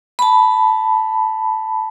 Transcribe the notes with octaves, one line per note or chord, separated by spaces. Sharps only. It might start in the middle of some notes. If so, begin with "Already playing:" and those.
A5 B5